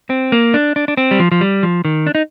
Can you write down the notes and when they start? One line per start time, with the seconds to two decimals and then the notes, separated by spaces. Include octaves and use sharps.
0.10 C4
0.32 A#3
0.54 D4
0.76 D4
0.88 D4
0.97 C4
1.11 G3
1.19 F3
1.32 F3
1.41 G3
1.63 F3
1.85 D#3
2.07 D4
2.15 D#4